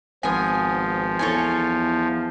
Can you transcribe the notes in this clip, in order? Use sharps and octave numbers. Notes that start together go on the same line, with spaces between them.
G#1 F3 B3 G#5
E2 A4 C#5 G#5